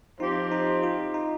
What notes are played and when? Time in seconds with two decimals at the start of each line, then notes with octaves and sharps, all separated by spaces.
0.19 F3 C4 D#4 G4 C5
0.52 D#4
0.83 F4
1.14 D#4